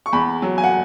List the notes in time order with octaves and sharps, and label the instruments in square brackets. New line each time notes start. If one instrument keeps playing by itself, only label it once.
[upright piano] C#6
E2 B5
F#3
G#5
F#5